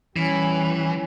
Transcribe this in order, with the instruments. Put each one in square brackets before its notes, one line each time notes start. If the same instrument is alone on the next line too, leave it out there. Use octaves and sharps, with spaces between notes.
[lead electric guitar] E3 [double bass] G3 C#4